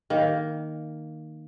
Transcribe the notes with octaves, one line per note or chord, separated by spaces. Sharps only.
D#3 A#3